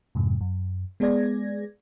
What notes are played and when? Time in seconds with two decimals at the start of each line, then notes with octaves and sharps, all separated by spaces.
0.15 F2 G#2 C3
0.41 F#2
1.00 G#3 B3 G#4 D5 G#6 A#6